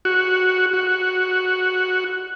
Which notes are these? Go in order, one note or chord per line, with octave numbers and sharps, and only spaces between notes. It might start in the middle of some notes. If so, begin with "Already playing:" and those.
F#4
F#4